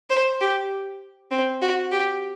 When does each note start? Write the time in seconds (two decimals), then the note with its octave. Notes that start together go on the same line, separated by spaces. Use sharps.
0.10 C5
0.41 G4
1.31 C4
1.61 F#4
1.92 G4